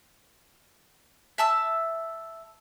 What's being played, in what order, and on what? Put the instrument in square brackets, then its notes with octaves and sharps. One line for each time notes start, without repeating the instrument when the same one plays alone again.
[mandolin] E5 A5 E6